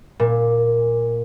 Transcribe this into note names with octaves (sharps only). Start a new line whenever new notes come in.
A#2